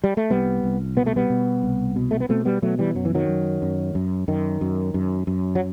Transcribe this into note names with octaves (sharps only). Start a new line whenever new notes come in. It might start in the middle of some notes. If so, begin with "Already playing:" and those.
G3
A3
C2 G3 B3
C2
B2 B3
A3
G3 B3
B2
C2
B2
A3
B3
B2 A3 C4
G3 B3
B2 F#3 A3
E3 G3
F#2 F#3
E3
D#3 F#3
F#2
F#2
F#2
F#2 D#3
F#2
F#2
F#2
F#3